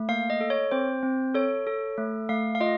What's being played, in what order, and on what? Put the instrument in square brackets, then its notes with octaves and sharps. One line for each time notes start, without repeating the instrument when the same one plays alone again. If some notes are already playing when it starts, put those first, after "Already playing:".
Already playing: [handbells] A3
A#3 F5
D#5
A4
C#5
C4 C5
C4
A4 C#5
A4
A3
A3 F5
F5
F4 D#5